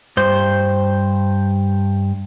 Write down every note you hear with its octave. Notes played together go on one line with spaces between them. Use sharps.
G2 C5